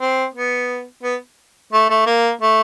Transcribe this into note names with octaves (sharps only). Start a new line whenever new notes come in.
C4
B3
B3
A3
A3
A#3
A3